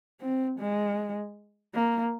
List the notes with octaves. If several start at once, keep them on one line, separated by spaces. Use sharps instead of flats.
C4
G#3
A#3